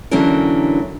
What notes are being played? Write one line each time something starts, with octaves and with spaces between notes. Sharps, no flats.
D3 E3 F#3 A#3 C#4 A#4